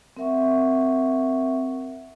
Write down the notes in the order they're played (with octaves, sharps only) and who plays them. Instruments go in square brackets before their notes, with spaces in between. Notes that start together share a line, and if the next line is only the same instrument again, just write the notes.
[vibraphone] C4 A#4 E5 F#5 C#6